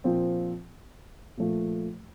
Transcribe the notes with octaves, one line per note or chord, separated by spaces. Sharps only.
A#2 F3 C4
A#2 F3 A3